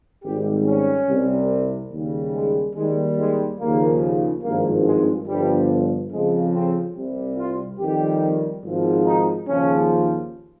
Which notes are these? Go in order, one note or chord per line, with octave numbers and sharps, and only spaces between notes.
G#1 G#2 G3 G4
C#4
C2 C3 G3
D#2 C#3 G3
G#3
D#2 D#3 G3 G#3
G#3
D#2 C#3 F3 A#3
G#1 G2 F3 A#3
G#3
G1 G2 F3 G3
F2 C#3 F3 G#3
C4
C2 C3 G3
F4
F2 D#3 G3 G4
G#1 G#2 F3
D#4
D#2 C#3 F3 C#4